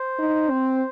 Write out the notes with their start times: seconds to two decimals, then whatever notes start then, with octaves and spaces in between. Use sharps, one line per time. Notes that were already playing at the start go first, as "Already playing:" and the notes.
Already playing: C5
0.19 D#4
0.50 C4